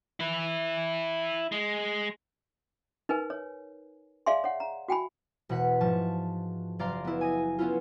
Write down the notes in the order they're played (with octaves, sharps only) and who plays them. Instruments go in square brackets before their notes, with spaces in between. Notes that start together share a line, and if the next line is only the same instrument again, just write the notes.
[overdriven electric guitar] E4 B4
G#3
[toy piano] D#4 A#4 B4 G#5
C#5
G#4 D5 E5 F5 G#5 C6
C#5 F#5
A#5
F#4 G5 G#5 B5
[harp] E1 B2 F#5 B6
G#2 F3 A5 C#6
F#1 D5 F5 A#5 C6
B3 E4
G#5 D#6 A#6
B3 C#4 E4 F4